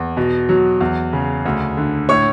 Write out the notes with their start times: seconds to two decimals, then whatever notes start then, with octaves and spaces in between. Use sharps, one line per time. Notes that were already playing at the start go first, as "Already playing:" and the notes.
Already playing: E2
0.17 B2
0.49 F#3
0.81 E2
1.13 C#3
1.45 D2
1.77 D3
2.09 A2 C#5 C#6